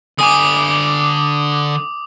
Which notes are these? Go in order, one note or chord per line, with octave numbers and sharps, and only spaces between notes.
D3 G#5 D6 D#6